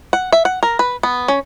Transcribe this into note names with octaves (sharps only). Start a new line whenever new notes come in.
F#5
E5
F#5
A#4
B4
B3
C#4